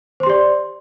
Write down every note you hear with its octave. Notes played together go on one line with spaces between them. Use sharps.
G4 C5 D5 C6